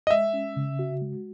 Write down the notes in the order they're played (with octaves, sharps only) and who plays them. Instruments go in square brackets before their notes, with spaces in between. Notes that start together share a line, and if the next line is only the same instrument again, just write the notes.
[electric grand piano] D#5
[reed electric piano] G#3 [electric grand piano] E5
[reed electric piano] C#4
C#3
F#4
G#3